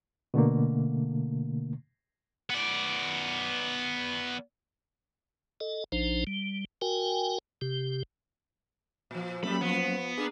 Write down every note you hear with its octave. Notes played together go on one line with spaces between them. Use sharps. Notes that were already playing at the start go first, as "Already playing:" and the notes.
B2 D3 A3 A#3
B3 D5
A4 D#5
A#1 F3 D4 D#4 C5
G3
F#4 A#4 G5 G#5
C3 G4
A#2 F3
F#3 G3 A3 A#3 C#4 A4 B5
F3 B3
A#3 D4 G#4